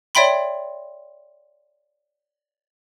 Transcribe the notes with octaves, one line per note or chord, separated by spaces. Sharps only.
C#5 D5 E5 G5 B5 C6